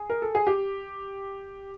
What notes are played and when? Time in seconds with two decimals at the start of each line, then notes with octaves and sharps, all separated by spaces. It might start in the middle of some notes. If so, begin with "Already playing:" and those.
Already playing: G#4
0.10 A#4
0.22 A4
0.35 G#4
0.47 G4